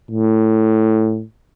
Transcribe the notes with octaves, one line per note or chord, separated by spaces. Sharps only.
A2